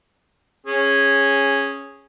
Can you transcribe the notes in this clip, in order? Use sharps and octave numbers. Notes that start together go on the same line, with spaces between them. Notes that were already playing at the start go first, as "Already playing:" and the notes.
C#4 G#4